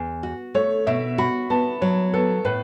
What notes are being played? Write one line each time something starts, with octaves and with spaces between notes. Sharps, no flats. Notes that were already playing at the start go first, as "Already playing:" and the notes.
Already playing: E2
F#4
A3 C#5
B2 E5
F#4 B5
B3 A5
F#3 C#5
B3 A4
A2 B4